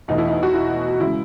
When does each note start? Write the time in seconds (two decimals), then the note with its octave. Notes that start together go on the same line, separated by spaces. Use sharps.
0.08 E2 B2 A3 D#4
0.18 E4
0.28 D#4
0.43 F#4
0.54 E4
1.00 C#3 G#3 E4